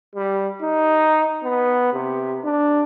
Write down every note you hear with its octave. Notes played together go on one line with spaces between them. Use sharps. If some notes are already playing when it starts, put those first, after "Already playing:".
G3
D#4
B3
C3
D4